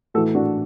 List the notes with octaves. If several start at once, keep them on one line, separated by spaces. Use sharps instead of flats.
A2 E3 F#4 A4
D4 F#4